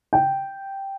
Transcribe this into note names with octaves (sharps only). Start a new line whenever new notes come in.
G5